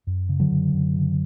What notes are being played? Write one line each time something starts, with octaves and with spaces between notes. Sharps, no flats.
F#2
C#3
D3 F#3
F#2
F#2
C#3